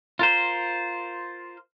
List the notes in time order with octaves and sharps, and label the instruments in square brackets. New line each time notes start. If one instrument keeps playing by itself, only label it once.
[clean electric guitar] F4 A#4 C5